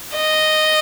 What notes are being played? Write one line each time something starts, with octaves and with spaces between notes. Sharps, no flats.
D#5